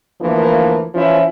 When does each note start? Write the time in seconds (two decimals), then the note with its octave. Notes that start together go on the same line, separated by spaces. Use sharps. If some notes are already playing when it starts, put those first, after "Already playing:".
0.21 D2 E3 F3 A#3
0.95 E3 F3 C#4 E4